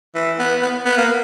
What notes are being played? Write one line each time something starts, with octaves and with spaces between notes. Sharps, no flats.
E3
B3
B3
B3
A#3